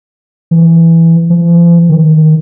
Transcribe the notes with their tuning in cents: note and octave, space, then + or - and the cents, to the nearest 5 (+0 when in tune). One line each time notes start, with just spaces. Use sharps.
E3 +5
F3 -40
D#3 +5